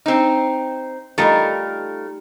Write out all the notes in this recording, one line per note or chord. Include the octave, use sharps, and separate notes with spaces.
C4 D#4
G3 A3 D#4 F4 A4 A#4